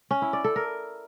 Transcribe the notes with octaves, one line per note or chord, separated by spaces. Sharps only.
C#4
E4
D5
A4
A#4